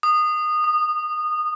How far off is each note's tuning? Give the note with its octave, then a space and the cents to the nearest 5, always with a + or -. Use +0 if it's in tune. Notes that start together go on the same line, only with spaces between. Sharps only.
D#6 -20
D#6 -40